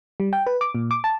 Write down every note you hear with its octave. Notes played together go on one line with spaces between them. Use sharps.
G3
G5
B4
D6
A#2
D6
A5